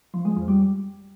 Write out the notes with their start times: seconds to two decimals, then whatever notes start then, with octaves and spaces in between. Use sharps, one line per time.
0.14 F3
0.25 G#3
0.37 F2
0.48 G3